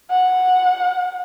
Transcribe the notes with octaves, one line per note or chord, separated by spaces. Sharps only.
F#5